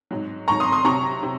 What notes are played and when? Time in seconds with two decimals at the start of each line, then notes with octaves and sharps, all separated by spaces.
0.11 G#2 F#3
0.48 G#2 F#3 A#5 C#6
0.60 C6 D#6
0.72 C6 D#6
0.85 C3 F#3 A#5 C#6
1.23 C3